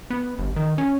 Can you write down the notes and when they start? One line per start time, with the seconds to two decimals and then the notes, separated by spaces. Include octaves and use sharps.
0.10 B3
0.39 G1
0.56 D#3
0.78 C#4